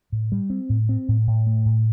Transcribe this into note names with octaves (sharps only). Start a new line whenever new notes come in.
A2
G3
C4
A2
C4
A2
A2
A3
A2